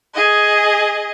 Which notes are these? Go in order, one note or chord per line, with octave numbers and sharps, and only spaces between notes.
G#4 D#5